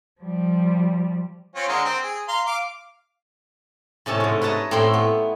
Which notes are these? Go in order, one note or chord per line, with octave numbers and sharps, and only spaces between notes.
F3 G3
C4 C#4 F4
D3 G#3 A#4
C4
G#4
F5 A#5 C6
F5 D6
A2 C3 C#4 A4 A5
G#2 A3
B4 C#5 D#5 A5 A#5
A2 A3 C4 E4 G5 C6
B3